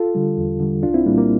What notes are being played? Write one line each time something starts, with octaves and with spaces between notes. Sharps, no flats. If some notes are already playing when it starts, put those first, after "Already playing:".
Already playing: F4 A4
D3 G3
E2
D3 G3
C2 D4 F4
C4 E4
A#2 G3 A#3 D4
A#3